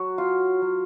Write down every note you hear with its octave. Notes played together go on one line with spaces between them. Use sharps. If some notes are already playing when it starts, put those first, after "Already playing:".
Already playing: F#3 F#4
F4
F#3